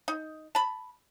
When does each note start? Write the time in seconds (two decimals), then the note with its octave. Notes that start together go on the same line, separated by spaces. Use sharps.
0.08 D#4
0.55 A5 B5